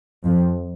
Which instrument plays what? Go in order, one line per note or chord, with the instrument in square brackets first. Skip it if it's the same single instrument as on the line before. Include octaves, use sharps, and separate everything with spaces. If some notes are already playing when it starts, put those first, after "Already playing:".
[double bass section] F2